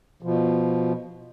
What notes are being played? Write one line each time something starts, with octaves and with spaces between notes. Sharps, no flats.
B2 F3